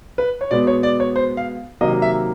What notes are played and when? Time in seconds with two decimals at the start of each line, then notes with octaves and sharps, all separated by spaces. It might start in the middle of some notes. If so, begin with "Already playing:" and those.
0.18 B4
0.41 C#5
0.51 B2 G#3 B3 D5
0.67 C#5
0.83 D5
1.00 C#5
1.16 C5
1.37 F5
1.81 C3 D#3 F#3 A#3 D#5
2.02 E5